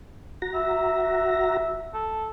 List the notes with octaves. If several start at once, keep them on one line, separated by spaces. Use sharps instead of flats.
F#4 A#5
E5
A4